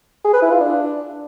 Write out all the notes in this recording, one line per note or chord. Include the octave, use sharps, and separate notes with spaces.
G#4
B4
E4
F4
D4